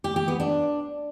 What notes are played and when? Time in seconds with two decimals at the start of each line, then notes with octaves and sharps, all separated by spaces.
0.04 G4
0.16 G4
0.28 B3
0.40 D4